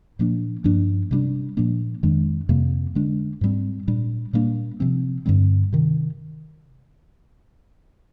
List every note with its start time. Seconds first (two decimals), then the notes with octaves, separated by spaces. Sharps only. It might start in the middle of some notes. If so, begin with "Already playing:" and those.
0.19 A#2 F3 A#3 D4
0.64 G2 F3 A#3 D4
1.11 C3 G3 A#3 D4
1.57 A#2 F3 A#3 D4
2.03 F2 D#3 G#3 D4
2.49 F2 C3 G3 A#3
2.95 D3 G#3 D4
3.41 G#2 G3 C4
3.88 A#2 G3 D4
4.33 A#2 G3 A#3 D4
4.80 C3 F3 C4
5.26 G2 D3 G3 C4
5.73 C3 D#3